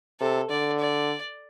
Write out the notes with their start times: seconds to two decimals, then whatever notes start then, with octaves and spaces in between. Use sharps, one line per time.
0.20 C3 A4
0.50 D3 D5
0.80 D5